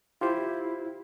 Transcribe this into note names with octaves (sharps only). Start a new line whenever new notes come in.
E4 F4 G4 C5